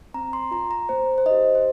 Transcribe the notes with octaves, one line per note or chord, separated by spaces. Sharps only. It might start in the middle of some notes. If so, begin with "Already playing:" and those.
C4 A#5
C6
F4 A#5
A#5
A#3 C5
C5
D#4 G4 D#5
C5